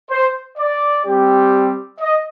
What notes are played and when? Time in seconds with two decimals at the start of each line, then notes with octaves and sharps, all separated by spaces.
0.10 C5
0.58 D5
1.05 G3 C4 G4
2.00 D#5